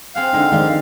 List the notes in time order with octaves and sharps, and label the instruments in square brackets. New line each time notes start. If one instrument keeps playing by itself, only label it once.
[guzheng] C4 G#4 F#5 [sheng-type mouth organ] F5
[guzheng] D3 G#3 [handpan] D#4
[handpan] D#3 G#3 D5 [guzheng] F3 C6